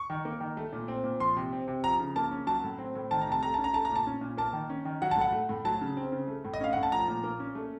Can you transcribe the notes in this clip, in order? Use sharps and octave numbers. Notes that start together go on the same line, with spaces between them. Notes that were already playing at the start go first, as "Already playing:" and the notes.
Already playing: C#6
D#3
A#3
D#3
A3
A#2
C4
A#2
F3 C6
C3
C4
C3
F3 A#5
C#3
A#3 A5
C#4
F#3 A5
A2
C4
A2
D#3 A5
A#5
C3 A5
A3 A#5
C#4 A5
A#5
A3 A5
A#2 A#5
A5
C#4
A#2
A#3 A5
D#3
C#4
D#3
F#3 F#5
A5
A2 F#5
A3
A2
F#3 A5
C#3
C4
C#3
A3
A2
D#5
C#4 F5
A2 F#5
A5
F3 A#5
A#2
A#3
C#4
A3